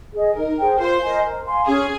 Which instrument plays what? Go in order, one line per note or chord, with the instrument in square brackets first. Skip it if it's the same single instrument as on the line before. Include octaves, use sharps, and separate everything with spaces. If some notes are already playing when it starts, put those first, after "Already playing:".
[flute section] G#4 D#5
[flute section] D#4 [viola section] A#4
[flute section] G#4 C5 G5
[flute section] F4 [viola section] C5
[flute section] A#4 D#5 G#5
A#4
F5 G#5 C6
[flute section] C#4 [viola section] G#4